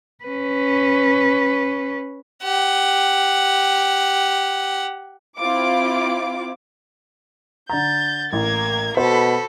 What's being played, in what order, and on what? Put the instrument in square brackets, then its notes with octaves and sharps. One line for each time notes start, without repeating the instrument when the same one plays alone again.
[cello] C#4 B4
[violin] G4 F#5
[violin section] C4 E4 F4 D6
[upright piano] D3 A#5 [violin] G6 A6
[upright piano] A1 [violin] A#3 G#6 [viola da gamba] A#4
[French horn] B2 [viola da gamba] F#4 A4 [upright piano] C5 [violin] B5